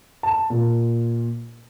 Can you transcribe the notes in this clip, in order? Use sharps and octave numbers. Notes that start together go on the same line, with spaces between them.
A5
A#2